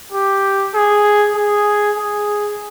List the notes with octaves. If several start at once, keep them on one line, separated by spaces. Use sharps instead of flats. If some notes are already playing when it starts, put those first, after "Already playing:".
G4
G#4
G#4
G#4